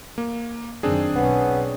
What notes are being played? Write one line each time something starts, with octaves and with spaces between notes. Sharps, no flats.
A#3
F#2 D#3 C4 D4 G#4
B1 B3 C#4